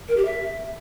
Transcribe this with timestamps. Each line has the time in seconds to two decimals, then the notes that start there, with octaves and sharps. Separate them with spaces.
0.08 A#4
0.17 G4
0.25 E5